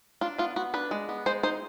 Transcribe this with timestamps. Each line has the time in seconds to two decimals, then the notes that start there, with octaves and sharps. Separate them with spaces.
0.21 D4 F4
0.38 B3 F4
0.56 B3 F#4
0.74 D4 B4
0.91 G#3
1.09 B3
1.26 G#3 C5
1.43 D#4 C5